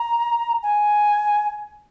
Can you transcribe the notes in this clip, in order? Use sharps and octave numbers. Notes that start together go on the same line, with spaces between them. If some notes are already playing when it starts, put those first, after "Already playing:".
Already playing: A#5
G#5